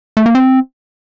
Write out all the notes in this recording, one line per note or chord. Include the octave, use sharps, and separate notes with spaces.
A3
A#3
C4